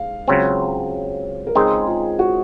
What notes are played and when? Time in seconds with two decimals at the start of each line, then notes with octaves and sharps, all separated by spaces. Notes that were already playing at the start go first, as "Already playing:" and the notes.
Already playing: G#2 F5
0.28 C#2 C#3 F#3 C4
1.47 A#4
1.55 C#2 C#3 G#3 C4 D#4 G#4
1.87 F4
2.19 F#4